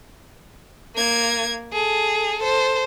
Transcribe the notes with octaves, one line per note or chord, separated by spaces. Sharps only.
A#3 G#6
G#4 A4
A4 C5